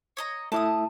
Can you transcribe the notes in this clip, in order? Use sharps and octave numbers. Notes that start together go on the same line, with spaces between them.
C#5 D#5 A#5
A3 E4 E5 A5 D6 D#6